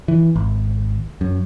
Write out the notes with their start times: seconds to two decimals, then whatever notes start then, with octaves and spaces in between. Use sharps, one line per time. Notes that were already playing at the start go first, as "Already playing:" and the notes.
0.08 E3
0.36 G#1
1.21 F#2